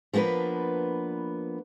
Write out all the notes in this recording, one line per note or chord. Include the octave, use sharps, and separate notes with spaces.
F3 A#3 B3 D4 B4